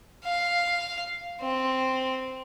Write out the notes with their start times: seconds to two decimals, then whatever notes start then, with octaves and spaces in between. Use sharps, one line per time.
0.25 F5
1.42 C4